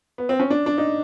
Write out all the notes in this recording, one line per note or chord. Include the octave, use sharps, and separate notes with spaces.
B3
C4
C#4
D4
D4
D#4